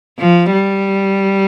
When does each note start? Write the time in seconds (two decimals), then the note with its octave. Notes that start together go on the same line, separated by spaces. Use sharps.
0.19 F3
0.53 G3